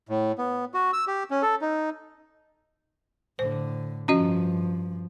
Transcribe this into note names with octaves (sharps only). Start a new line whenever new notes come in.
A2
B3
F#4
E6
G4
C#4
A4
D#4
A2 D3 C5
G2 F3 C#4 F#4 D#5